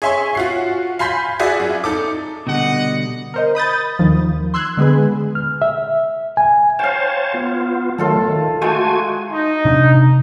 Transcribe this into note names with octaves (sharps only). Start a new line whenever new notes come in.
G#4 C#5 E5 G#5 C6 C#6
F4 F#4 C7
F5 G#5 B5 C6 G6 B6
F4 F#4 G#4 D5 E5
F#2
D#4 A4 D6
B2 D3 G3 D#5 F#5
A#4 C5 D#5
B5 D#6 G6 A6
D#2 D#3 F3
C6 E6 F#6 G#6
D3 G#3 B3 G#4 B4
F6
E5
G#5
C5 C#5 F5 G5 A5
B3 F4
D#3 F#3 A3 F4 A4 A5
D#3
G#3 A3 F#4 G#5
D#4
C3 D4